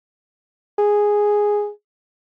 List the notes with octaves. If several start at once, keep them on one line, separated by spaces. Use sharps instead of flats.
G#4